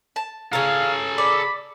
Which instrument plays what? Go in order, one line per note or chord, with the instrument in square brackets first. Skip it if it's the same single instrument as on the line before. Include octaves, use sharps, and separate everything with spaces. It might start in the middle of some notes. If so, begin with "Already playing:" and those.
[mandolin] A5
[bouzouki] C#3 A#4 [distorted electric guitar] A4 G#5 [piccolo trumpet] F5
[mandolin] D5 [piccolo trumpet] B5